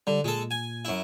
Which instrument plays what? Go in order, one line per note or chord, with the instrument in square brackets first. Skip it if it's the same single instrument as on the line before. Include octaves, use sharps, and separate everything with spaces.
[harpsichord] D3 [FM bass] G3
[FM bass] A#2 [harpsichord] G#3 A4
[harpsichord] G#5
F#2 E4